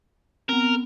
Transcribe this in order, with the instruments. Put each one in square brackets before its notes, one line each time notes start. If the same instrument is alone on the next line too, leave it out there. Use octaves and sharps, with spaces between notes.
[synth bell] B3 C4 [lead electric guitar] A#4